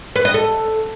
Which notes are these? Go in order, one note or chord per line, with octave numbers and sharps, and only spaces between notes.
B4
D#5
A4